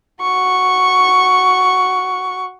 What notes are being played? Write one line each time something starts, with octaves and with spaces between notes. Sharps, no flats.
F#4 C#6